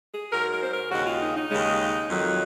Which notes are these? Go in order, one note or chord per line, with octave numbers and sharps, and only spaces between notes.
G#4
G#2 F#3 A#4
A#4
C5
A#4
D#2 C#3 G#3 F#4
F4
D#4
D#4
D#2 C#3 G#3
F2 D#3 F#3